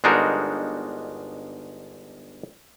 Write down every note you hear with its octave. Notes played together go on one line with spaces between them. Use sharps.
G1 G#3 D4 D#4 F#4 A#4